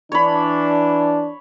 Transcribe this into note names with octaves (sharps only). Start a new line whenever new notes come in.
E3 D4 C#5 B5